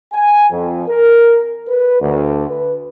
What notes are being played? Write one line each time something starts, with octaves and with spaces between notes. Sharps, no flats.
G#5
F2
A#4
B4
D2
B4